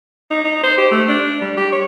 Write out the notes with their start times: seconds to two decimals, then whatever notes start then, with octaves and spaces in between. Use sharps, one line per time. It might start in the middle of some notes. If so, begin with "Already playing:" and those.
0.31 D#4
0.44 D#4
0.63 C5
0.78 G4
0.91 A3
1.09 D4
1.41 G3
1.57 G4
1.72 C#5